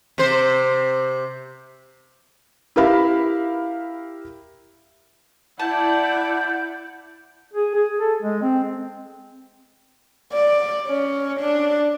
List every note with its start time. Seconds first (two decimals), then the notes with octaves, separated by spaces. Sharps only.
0.18 C3 C5
2.76 E4 G4 A#4 E5 F5 B5
5.59 E4 D5 F#5 A5 G6
7.54 G#4
7.75 G#4
7.99 A4
8.22 G#3
8.42 C4
10.33 D5
10.87 C#4
11.40 D4